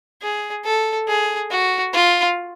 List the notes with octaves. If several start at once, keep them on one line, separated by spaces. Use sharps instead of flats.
G#4
A4
G#4
F#4
F4